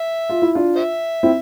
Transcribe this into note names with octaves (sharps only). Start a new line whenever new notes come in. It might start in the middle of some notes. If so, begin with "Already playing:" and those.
Already playing: E5
F4
E4
D4 F4
C5 E5
C4 E4